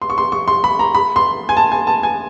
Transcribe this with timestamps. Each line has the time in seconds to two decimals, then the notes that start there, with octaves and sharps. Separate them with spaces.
0.02 C6
0.10 C#6
0.18 C6
0.32 C#6
0.48 C6
0.64 B5
0.79 A#5
0.95 B5
1.16 C6
1.49 G#5
1.57 A5
1.72 G#5
1.87 A5
2.03 G#5